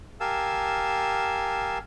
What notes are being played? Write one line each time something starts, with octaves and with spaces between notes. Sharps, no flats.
G4 A#4 F5 G#5 A5 E6